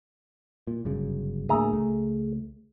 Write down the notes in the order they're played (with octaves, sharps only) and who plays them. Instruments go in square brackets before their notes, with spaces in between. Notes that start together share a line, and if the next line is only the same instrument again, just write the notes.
[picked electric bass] A#2
G1 F#2 C#3
[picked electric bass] D2 A2 A#3 [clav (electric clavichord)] G#4 E5 A#5
[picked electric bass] C#2 A3